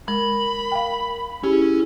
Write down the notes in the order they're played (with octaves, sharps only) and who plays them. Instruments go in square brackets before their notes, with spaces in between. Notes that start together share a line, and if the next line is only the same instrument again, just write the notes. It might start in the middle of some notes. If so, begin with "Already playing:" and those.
[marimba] G#3 [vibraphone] A#4 [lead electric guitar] B5
[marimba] F5 G5
[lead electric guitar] C#4 [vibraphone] E4 G#4 [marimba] G4